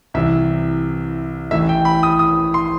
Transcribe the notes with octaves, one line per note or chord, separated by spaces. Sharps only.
C2 C3 E3 E5
A1 A2 E3 E5
G5
B5
D#6
D#6
C6